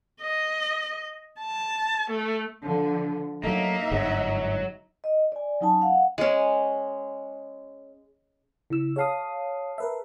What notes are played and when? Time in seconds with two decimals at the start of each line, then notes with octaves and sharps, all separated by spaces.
0.21 D#5
1.40 A5
2.10 A3
2.66 D3 F3
3.44 F#3 A3 A#3 D#4 E5
3.91 G1 G#2 F#3 G#3
5.04 D#5
5.32 D5 G#5
5.61 F#3 C#4 D#4 G#5 A5
5.81 F5 F#5
6.18 G#3 C#4
8.70 C#3 E4 E6 E7
8.96 G#4 C#5 F5 A5 D#6 C7
9.78 A#4 B4 E5